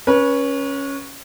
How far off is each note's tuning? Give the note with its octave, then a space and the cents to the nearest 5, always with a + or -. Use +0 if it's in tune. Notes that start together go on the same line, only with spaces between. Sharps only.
C#4 +0 B4 -35